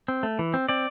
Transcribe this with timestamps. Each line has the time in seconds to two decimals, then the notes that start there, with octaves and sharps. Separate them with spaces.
0.08 C4
0.23 A3
0.39 E3
0.54 C4
0.69 C4 D5